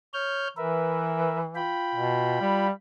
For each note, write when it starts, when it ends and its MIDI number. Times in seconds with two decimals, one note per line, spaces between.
0.14 0.48 73
0.14 0.48 89
0.14 0.48 91
0.57 1.73 52
0.57 1.39 70
0.57 1.39 71
0.57 1.39 76
1.55 2.67 65
1.55 2.67 79
1.55 2.67 83
1.95 2.39 47
2.41 2.71 55